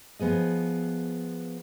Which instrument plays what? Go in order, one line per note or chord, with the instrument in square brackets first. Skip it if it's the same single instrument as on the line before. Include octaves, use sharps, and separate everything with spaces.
[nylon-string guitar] F3 B3 G#4 D#5